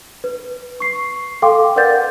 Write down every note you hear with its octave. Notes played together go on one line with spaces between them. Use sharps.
B4
C#6 C7
A4 F5 G5 C6 D6
A#4 B4 D5 F#5 G6 A6